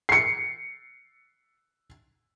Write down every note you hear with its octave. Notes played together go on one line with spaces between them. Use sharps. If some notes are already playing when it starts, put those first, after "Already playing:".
C7 C#7